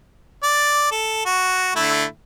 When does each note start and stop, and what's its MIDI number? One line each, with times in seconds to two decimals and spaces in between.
0.43 0.89 74
0.91 1.26 69
1.26 1.73 66
1.76 2.05 50
1.76 2.05 57
1.76 2.05 64